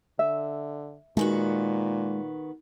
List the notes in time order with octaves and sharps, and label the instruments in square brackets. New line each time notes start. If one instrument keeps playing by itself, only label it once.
[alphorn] D3 [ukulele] E5
[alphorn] A#2 [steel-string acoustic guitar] D#3 B3 F#4 [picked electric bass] G#3